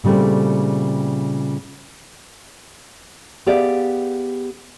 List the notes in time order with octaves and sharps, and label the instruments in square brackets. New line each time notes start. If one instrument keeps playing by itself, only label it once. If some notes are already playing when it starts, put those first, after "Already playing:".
[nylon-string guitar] A#2 C#3 G3 A3 C4
B3 G4 G#4 D5 E5 F5